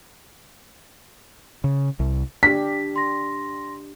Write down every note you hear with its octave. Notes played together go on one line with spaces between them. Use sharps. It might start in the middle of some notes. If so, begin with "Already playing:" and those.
C#3
C2
D4 G4 B6
C6 A#6